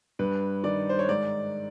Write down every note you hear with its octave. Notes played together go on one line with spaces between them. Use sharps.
G2 B4
D#3 D5
C5
C#5
G#2 D5